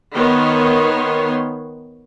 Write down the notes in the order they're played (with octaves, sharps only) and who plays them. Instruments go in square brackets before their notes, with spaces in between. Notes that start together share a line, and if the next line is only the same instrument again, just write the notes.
[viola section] D#3 B3 C#5 C6